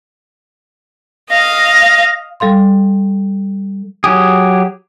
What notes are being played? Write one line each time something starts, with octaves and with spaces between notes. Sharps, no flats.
D#5 F5 A#6
G3 A4 F5 C6
F#3 G4 G#4